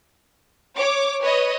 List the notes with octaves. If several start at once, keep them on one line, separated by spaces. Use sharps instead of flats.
C#5 D6
B4 C#5 D#5